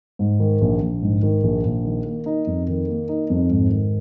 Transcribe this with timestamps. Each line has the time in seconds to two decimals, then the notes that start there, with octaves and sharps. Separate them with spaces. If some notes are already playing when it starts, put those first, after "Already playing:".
0.19 G#2
0.40 D#3
0.61 A#1
0.81 A#1
1.02 G#2
1.23 D#3
1.43 A#1
1.65 A#1
1.84 D#3
2.06 A#3
2.26 D#4
2.47 F2
2.68 D#3
2.88 A#3
3.09 D#4
3.30 F2
3.50 G#2
3.70 D#3